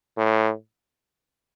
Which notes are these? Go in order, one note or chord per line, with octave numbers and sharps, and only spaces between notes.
A2